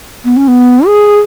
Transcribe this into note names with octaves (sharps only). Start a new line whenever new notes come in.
B3
C#4
B3
G#4